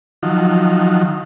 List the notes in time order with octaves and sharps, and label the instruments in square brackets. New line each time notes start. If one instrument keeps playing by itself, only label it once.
[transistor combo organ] D#3 F3 F#3